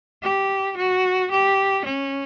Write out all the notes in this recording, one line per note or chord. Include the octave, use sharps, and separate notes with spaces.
G4
F#4
G4
C#4